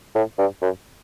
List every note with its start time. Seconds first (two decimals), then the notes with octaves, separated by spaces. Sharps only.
0.15 A2
0.39 G2
0.62 F#2